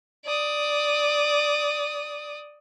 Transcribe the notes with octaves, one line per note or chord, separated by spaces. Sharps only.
D5 D#6